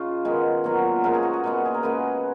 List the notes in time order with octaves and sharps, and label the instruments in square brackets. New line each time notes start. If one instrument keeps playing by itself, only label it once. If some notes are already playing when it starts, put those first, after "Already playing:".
Already playing: [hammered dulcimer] C#3 D#4 F4
D#3 G#3 B3
A#2 F#3 B3 F4
C#3 F3 G#3 A#4
G#4
F#4
G#4
A#2 G#3 B3
G#4
A#4
C#3 G#3 B3 B4